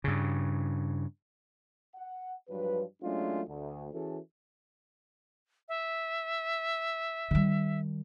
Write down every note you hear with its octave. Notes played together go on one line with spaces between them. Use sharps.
G2 C#3
F#5
G2 F3 F#3 B4
F#3 G#3 A3 C#4 D4 F4
D2
E3 C#4 F#4 G#4 A4
E5
D#3 G3